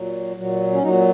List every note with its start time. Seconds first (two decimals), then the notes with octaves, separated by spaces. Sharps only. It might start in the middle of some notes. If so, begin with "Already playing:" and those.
Already playing: A#2 F#3
0.36 A#2 F#3
0.72 C#4
0.83 A#2 F#3 D#4